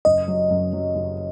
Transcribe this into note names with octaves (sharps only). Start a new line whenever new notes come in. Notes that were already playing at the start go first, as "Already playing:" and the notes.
F#1 D#5
F#3
F#2
F#3
F#1